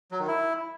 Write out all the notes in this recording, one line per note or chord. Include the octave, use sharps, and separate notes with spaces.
F#3
D#3
E4